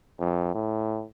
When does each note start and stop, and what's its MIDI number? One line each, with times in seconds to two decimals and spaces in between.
0.20 0.52 41
0.55 1.04 45